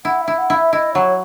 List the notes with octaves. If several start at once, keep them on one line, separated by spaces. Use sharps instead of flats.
E4 F#5
E5
E4
F#5
E4
E5
E4 D#5
F#3 C#5